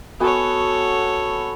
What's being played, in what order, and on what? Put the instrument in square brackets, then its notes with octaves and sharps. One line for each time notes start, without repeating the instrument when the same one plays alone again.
[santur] B3 F#4 G#5 [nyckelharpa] A4 C#5